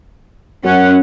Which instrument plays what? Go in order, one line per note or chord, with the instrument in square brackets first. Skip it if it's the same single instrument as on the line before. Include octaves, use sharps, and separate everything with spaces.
[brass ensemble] F#2 F#5 [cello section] C#4